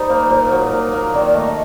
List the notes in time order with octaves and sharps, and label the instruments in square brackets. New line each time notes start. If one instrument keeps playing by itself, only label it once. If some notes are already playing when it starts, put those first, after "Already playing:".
Already playing: [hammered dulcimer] G3 D#4 [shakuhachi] C5
[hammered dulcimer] A#3
A#2
F#3
A#2
A#3
[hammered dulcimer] D#3 [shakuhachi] D5
[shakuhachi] D5
[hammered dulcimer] A3 [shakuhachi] D#5